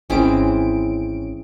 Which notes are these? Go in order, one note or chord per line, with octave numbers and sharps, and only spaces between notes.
G#1 E3 G#3 C4 C#4 D7